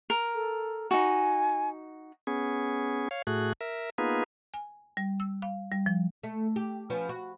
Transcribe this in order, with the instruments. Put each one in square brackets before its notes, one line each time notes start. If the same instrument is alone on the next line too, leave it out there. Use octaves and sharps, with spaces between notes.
[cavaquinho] A#4
[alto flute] A4
[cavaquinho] D#4 F#4 [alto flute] G#5
[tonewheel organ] B3 C#4 G#4
C#5 F5
A2 A3 F#4 G#4 F#6
A#4 E5
A#3 B3 D#4 F4 G#4 B4
[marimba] G#5
G3
E6
F5
G3
F3
[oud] A3
G4
F3 B3 C#4
F#4